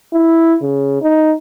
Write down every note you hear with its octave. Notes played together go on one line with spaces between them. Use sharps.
E4
C#3
D#4